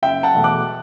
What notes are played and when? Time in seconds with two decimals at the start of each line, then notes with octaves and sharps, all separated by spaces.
0.02 F#1 E5 G5
0.23 F#5 A5
0.34 E2 B2 A3
0.44 D6 F#6